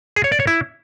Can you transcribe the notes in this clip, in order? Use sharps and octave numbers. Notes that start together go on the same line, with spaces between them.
G#4
C#5
D5
C#5
E4